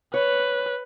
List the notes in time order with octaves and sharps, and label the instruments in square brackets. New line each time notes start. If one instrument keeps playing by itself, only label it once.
[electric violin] B4 [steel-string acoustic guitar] C#5